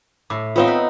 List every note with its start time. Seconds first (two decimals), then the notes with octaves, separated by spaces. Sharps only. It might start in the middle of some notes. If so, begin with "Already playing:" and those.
0.30 A2 D6
0.56 B3 C4 D#4 F4 C#5 F5
0.68 B4